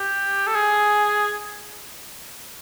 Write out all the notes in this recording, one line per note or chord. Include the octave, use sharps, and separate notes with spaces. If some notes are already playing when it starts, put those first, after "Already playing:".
Already playing: G4
A4
G#4